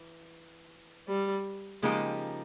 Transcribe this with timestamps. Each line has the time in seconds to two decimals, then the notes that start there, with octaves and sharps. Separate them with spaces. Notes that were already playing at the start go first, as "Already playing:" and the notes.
Already playing: E3
1.08 G3
1.82 C#3 F3 G#3 A#3 D#4 G4